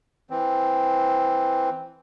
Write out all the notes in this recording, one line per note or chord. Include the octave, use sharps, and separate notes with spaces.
E3 C4